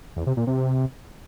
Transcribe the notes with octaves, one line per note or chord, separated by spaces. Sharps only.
E2
C3
A#2
C3
C3